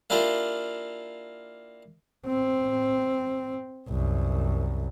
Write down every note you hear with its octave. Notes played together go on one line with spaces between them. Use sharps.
A#3 D4 E4 F4 G4 A#4
C4
C2 F#2